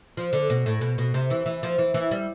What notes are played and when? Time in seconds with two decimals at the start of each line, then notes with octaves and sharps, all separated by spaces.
0.17 F3
0.33 D3
0.50 B2
0.66 A2
0.81 B2
0.98 B2
1.14 C3
1.30 E3
1.46 E3
1.63 F3
1.79 E3
1.94 E3
2.11 G3